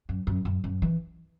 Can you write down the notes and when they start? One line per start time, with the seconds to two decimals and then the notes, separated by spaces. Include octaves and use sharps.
0.09 F#2
0.27 F#2
0.45 F#2
0.64 F#2
0.82 E3